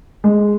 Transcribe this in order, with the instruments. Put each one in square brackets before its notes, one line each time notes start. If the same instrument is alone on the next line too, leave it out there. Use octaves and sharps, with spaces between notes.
[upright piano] G#3